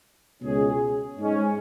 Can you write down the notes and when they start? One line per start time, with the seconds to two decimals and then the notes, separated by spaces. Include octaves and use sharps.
0.41 C#2 B2 G#3 C#4 G#4
1.18 G#2 G#3 C#4